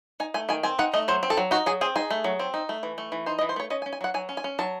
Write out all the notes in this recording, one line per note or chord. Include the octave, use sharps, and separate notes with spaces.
D#4 G#5
A3 G#5
D#3 G#5
C4 G#5
D#4 F#5
A3 D#5
F#3 C5
C4
A4
F#3
D#4 F#4
F#3 G#4
C4 G#4
D#4 G#4
A3
F#3
C4
D#4
A3
E3
A3
E3
D#4 C5
D#5
E3
C5
A3 C#5
C#4 D#5
G#5
C#4
G#5
F#3 F#5
F#3 G#5
C#4
G#5
C#4
F#3 A5